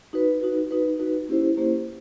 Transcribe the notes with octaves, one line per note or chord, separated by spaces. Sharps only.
D#4 F#4 B4
D#4 F#4 B4
D#4 F#4 B4
D#4 F#4 B4
A#3 C#4 E4 G4 C5
A#3 C#4 E4 G4 C5